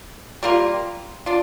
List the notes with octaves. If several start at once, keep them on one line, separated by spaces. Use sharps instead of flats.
G3 A#3 F4
D4 F4